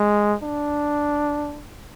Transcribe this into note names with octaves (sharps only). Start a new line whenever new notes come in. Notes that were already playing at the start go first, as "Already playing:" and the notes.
Already playing: G#3
D4